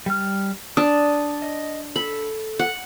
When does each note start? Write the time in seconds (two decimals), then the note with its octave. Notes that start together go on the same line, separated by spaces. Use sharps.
0.06 G3 F6
0.77 D4 D5 D#6
1.42 D#5
1.96 A4 B5
2.59 F#5